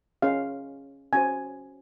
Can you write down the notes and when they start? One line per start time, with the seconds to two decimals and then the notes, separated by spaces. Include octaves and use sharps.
0.22 C#4 G#4 C#5 F5
1.13 C#4 F#4 C5 G#5